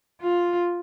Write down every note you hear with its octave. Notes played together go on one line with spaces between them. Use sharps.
F4